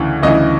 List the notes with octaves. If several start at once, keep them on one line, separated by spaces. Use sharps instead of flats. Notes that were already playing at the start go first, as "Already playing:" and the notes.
Already playing: D2 C#3 E3
D2 C#3 E3 D#5